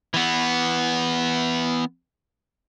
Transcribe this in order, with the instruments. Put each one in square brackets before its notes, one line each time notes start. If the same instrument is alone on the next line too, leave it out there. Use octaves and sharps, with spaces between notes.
[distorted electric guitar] E3 B3